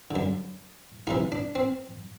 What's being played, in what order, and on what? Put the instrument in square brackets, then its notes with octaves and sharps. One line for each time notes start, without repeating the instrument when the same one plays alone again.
[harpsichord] F#2 D3
D2 C3 E3 D#4
D4
C4